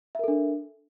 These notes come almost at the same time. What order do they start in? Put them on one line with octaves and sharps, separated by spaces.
E5 A#4 A4 D4